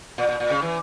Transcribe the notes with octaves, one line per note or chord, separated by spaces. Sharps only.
A#2
A#2
A#2
C#3
E3